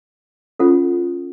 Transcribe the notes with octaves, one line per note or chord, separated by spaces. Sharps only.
C#4 F4 A4 C5 F#5